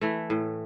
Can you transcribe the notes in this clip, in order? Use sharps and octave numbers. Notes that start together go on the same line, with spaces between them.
E3 A3
A2